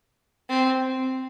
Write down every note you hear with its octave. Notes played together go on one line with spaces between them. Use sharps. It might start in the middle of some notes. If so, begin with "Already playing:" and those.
C4